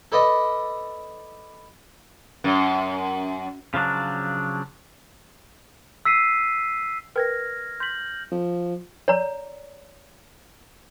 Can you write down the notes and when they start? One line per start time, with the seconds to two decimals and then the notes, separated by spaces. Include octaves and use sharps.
0.12 A4 B4 D5 D#5
2.44 F#2
3.74 C#3 F3 F#3 D4
6.05 E6 B6 C7 D#7
7.16 A#4 B4 G5 F6 G#6 A#6
7.80 C6 G6 B6 F#7
8.32 F3
9.08 C#5 D5 A#5